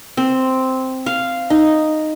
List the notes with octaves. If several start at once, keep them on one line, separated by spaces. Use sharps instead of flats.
C4
F5
D#4